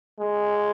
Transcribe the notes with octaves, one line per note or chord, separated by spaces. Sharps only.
G#3